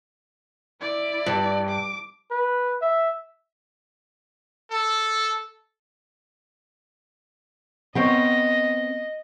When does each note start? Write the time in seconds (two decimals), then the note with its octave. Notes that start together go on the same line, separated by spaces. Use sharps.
0.81 E4 D5
1.26 G2
1.68 D6
2.31 B4
2.82 E5
4.70 A4
7.95 B3 C4 C#5 D#5